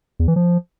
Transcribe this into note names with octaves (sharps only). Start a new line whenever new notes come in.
E2
E3
F3